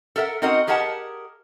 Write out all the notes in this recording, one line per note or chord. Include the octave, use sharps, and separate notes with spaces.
A4 A#4 E5 F#5
C4 D#4 F#4 A#4 D#5 F#5
G4 G#4 A#4 D#5 F#5 A5